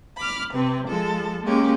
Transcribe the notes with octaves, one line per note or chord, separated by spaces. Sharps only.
B5 D6 F6
C3 C4 B4
F3 G#3 A4
G#3 A#3 C#4 G4